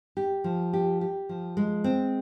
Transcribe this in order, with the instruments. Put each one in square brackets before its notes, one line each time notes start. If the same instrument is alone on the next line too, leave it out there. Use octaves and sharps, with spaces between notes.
[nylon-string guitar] G4
F3
G4
G4
F3
G#3
C4